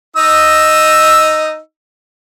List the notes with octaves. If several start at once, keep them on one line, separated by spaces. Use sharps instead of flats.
D#4 D#5 E6